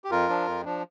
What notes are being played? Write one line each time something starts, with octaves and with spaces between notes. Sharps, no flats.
G4
F2 F4 A#4
F3 D4
F2
F3 D4